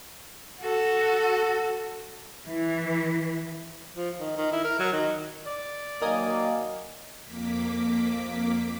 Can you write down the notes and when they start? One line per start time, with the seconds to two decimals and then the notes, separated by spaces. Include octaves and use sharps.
0.61 F#4 A4
2.46 E3
3.96 F3
4.19 D#3
4.37 D#3
4.52 E4
4.64 A#4
4.79 F#3
4.93 D#3
5.46 D5
6.02 D#3 F#3 A#3 A#4 D#5 G#5
7.23 F2 A#3 D6 B6